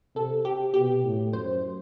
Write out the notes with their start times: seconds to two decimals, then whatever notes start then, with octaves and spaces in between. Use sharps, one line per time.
0.15 C3 A4
0.45 G4
0.74 B2 G4
1.03 A2
1.33 F#2 C5